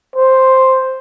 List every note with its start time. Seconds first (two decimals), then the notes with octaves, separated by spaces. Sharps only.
0.16 C5